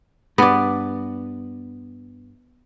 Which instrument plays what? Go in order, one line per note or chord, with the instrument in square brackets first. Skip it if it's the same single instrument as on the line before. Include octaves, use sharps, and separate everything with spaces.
[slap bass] G2 [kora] B3 D5